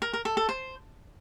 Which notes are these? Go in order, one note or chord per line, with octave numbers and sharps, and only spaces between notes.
A#4
A#4
A4
A4
C5